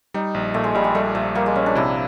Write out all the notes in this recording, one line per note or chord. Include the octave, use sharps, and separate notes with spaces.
G3 D#4
A#1
A#2 A3
G#3
A#1 G3
G#3
G3 A3
A#1 A3
G3 A#3
G#3
A#1 C#4
D4
C3 E4